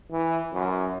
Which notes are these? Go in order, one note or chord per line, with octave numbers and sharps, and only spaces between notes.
E3
F#2